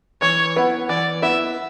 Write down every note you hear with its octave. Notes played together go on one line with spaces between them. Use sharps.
E3 C#5
B3 E4 B4
E3 D5
B3 E4 B4 E5